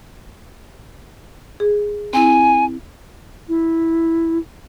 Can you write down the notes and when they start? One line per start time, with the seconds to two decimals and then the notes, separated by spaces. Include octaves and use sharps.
1.60 G#4
2.13 C4 E4 G#5
3.49 E4